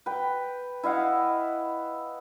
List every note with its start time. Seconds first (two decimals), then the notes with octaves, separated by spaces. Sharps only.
0.06 B4 G5
0.83 E4 D#5 F5 F#5